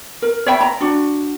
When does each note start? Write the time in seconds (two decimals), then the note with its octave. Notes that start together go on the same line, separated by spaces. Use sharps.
0.22 A#4
0.46 C#5 E5 G5 B5
0.61 A#5
0.81 D4 F#4